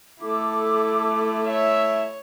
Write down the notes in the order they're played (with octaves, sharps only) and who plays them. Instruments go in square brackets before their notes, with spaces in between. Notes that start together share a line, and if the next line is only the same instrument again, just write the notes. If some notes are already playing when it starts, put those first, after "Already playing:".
[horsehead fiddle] A3 E4 [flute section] A4 D6
[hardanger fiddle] C#5 [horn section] E5